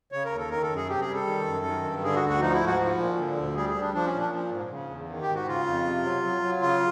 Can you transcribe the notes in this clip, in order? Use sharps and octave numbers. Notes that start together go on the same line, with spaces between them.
C#3 C#5
A#4
D#2
A4
D#3 A#4
A4
F#2
G#4
C3 G4
G#4
G3
A4
D#3
F#2
D#3
G2
D3 G#4
F#4
D2
F#4
F3 D#4
E4
G#2
F#4
F3
A#2
D3
D2
G3 G#4
G#4
G3
D4
F3 D4
C#4
A#2
D4
F3
G#2
C#3
E2
D#3
G4
G#2
F#4
C#3 F4
F2
C3
F#3
F#3
F#3
C#3 F4